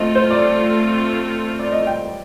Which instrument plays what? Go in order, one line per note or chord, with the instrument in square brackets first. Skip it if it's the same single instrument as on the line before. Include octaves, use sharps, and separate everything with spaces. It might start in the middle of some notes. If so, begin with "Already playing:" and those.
Already playing: [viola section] A3 C4 F4 A4 [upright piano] D#5
[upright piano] C5
D5
D5
D#5
G5